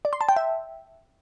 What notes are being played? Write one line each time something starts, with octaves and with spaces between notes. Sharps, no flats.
D5
C6
A5
G5
E5